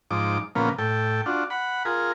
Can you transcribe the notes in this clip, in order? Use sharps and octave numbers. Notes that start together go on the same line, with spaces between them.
G#2 F3 D#4 D6
A#2 C#3 F3 A#3 B3
A2 A4 G5
D4 F4 F#4
F#5 B5
F4 G#4 A#4